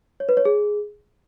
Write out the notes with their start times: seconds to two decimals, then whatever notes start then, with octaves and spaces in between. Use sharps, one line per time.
0.20 C#5
0.29 B4
0.37 C#5
0.45 G#4